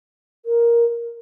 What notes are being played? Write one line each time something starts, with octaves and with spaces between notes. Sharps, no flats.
A#4